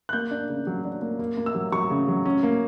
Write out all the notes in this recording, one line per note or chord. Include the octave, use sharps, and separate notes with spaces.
F#6
A#3 G6
D4
C#3
F#3
D4
A#3
A#3
A#3
E6
F#3
F#3 C#6
C#3
F#3
C#4
A#3